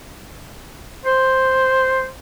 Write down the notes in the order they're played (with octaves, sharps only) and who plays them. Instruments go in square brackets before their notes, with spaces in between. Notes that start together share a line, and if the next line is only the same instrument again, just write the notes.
[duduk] C5